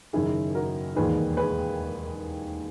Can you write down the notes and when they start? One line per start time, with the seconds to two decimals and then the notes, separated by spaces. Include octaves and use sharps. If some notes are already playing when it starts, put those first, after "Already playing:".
0.13 F#1 F#2 D#3 E4 G#4
0.55 F#4 A#4
0.96 E1 D#2 D#3 G#4 B4
1.37 G#4 B4